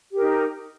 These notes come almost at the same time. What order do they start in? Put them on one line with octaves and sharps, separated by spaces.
G4 A#4 D#4